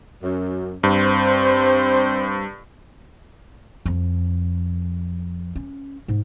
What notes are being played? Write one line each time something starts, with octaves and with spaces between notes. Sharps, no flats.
F#2
G2 C4 C5
F2
C#4
G#2